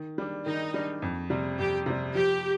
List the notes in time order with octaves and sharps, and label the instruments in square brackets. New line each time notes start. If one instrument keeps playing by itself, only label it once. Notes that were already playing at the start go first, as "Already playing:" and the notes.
Already playing: [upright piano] D#3
G3 D4
[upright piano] D#3 [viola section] D#4
[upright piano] G3 D4
F2
C3 G3
[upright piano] F2 [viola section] G4
[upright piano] C3 G3
[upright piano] F3 [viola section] G4